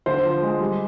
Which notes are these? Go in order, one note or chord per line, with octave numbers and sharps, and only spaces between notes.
D3 C5
F3
G#3
G3